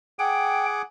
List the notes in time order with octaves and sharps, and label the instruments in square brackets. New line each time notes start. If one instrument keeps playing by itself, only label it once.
[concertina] G#4 F#5 D6 [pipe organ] G5